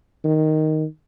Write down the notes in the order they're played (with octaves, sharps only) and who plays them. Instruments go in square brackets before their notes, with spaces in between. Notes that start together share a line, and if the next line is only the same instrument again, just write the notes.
[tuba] D#3